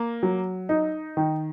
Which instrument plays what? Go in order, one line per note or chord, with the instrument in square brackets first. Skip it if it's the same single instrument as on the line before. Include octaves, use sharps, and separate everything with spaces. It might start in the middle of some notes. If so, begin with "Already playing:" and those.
Already playing: [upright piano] A#3
F#3
D#4
D#3